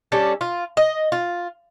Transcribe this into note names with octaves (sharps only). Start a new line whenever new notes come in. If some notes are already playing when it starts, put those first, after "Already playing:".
G3 C#4 D4 A4
F4
D#5
F4